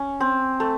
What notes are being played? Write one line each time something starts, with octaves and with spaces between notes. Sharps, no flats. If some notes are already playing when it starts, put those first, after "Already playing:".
Already playing: C#4
C4
A3